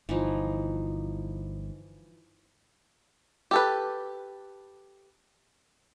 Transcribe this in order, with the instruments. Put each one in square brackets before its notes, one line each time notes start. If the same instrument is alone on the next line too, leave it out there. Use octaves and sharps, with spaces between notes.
[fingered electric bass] G1 [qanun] E3 F3 D#4
[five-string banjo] G4 A4 B4